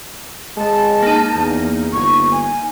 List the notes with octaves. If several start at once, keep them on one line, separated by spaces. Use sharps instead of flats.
G#3 A5
A#3 D#4
E2
G1 C#6
G#5